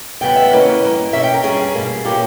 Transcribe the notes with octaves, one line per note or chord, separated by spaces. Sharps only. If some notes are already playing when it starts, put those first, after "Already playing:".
E2 C#3 G3 B3 G5
E5
C#3 E3 A#3 C#4 D#5
G2 G3 A#3
B2 A#3 C#4 E5
G5
A#4
G2 G3 C#4 G#4
B2 G3 A#3
A#2 A#3 C#4 G4